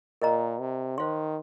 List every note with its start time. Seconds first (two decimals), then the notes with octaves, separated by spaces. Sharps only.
0.22 A#2 A#4 D#5 A#5
0.60 C3
0.98 D#3 C5 F5 C6